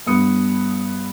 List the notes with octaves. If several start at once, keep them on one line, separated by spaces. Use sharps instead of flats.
G2 B3 D#6 C#7